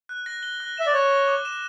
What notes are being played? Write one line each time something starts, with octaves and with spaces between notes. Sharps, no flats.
F#6
A#6
G7
F#6
E5 E7
D5
C#5 F#6
A#6
D6
E7